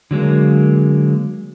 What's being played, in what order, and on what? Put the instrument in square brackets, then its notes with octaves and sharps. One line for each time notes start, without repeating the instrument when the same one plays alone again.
[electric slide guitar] D3 F#3 G#3 A#3